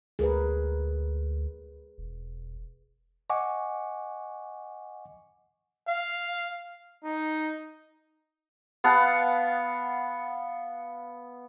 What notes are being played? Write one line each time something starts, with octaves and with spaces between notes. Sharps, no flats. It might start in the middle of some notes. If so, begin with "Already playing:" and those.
D2 G#4 A#4 B4
E1
D#5 F#5 G#5 C#6 D6
F5
D#4
B3 F5 F#5 A5